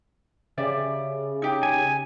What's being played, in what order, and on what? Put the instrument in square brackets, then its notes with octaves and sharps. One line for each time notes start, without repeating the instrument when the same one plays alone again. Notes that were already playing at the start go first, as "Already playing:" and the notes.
[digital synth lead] C#3 [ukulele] G4 D5 E5
[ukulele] D#4 G4
[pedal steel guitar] G#5